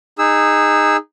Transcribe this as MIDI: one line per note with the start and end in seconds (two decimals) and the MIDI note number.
0.19 0.97 63
0.19 0.97 68
0.19 0.97 88